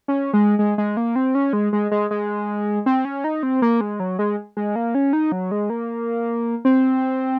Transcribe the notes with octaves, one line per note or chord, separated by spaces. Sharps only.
C#4
G#3
G#3
G#3
A#3
C4
C#4
G#3
G#3
G#3
G#3
C4
C#4
D#4
C4
A#3
G#3
F#3
G#3
G#3
A#3
C#4
D#4
F#3
G#3
A#3
C4